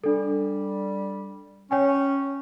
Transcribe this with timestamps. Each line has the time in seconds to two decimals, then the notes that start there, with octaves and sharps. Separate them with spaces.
0.04 G3 D4 A4
1.71 C#4 C#5 G5 G#5